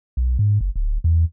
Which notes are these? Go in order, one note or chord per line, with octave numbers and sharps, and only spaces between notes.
B1
G#2
F#1
D1
E2